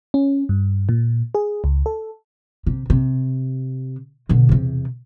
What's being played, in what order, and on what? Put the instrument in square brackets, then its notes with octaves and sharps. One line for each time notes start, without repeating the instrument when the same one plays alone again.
[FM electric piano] C#4
G2
A#2
G#4
C#2
A4
[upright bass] C3
C3
B2 D3
E2 C3